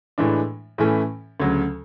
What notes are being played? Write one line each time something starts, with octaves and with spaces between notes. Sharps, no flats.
A2 E3 G#3 D4
A2 E3 A3 C#4
D2 C#3 F#3